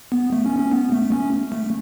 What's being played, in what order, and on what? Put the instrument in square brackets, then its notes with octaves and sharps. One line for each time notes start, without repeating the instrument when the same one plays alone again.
[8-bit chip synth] B3
A3
C#4
C#4
B3
A3
C#4
A3